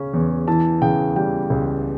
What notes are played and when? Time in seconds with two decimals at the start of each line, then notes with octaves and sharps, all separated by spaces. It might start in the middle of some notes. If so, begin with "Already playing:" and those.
Already playing: C#3 C#4
0.14 E2
0.48 E3 A5
0.82 C#3 G5
1.16 G3 G5
1.50 C#2